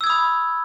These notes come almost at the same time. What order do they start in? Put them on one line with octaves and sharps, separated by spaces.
E6 G#6 D#6 B5